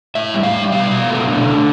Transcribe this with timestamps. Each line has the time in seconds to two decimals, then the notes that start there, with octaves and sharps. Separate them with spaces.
0.15 A2 E5
0.34 G3
0.43 F5
0.53 G3
0.72 B2 F5
0.91 B2
1.10 A3
1.29 D3
1.48 D3